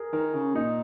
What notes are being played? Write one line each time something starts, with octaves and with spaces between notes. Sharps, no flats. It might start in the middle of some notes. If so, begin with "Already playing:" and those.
Already playing: G#4 A#4
D#3 A#4
C#3
A#2 D#4